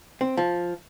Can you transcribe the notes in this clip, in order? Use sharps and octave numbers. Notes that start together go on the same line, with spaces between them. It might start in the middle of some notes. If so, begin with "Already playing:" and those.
C4
F3